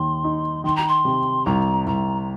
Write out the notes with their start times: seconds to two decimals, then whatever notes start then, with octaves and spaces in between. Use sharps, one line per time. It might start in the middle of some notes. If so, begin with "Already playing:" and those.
Already playing: D#2 C6
0.24 D#4
0.64 D#3 C6
0.76 A#5
0.88 C6
1.05 C3
1.45 C2 A#5
1.87 C2 A#5